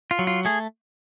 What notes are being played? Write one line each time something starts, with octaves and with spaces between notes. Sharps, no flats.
F4
F#3
F4
A3 G#4